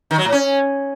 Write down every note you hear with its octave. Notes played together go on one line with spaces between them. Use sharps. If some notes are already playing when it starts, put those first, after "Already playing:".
D#3
F#3
A2
C#4